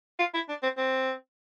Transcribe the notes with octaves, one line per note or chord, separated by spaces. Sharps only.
F4
E4
D4
C4
C4